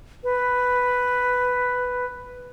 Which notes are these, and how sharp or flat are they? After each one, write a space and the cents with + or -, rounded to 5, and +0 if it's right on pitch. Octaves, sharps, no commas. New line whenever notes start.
B4 +5